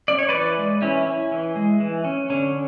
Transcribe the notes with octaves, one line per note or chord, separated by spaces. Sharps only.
C#4 D5
C#5
E3 B4 D5
G#3
E3 C#4 E4
C#4
E3
G#3
E3
C#4
D3 C#4